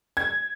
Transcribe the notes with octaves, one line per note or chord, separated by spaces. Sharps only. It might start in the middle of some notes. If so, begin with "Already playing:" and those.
G#6